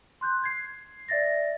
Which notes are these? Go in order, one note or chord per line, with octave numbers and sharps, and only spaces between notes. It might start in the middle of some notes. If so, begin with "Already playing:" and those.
C6 F#6 G6
G#6 C7
D5 E5 A6 A#6